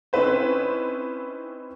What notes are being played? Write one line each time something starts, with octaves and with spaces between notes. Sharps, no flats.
C4 C#4 D#4 E4 B4 C5